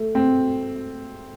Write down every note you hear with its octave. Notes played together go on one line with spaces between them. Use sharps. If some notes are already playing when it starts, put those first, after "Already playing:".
Already playing: A3
C4